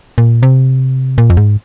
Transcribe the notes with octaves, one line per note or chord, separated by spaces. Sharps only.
A#2
C3
A#2
F2
G#2